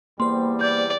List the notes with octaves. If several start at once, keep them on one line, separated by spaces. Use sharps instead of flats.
E2 G3 A#3 C5 C6
D5 G6